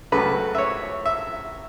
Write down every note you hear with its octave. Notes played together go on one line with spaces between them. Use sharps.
C#2 C#3 F#3 A3 B4
E5
C#5
E5